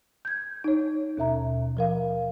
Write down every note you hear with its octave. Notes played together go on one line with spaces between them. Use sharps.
G6 G#6
D#4 C#5
D#2 B2 E5 A#5
F3 A#4 F5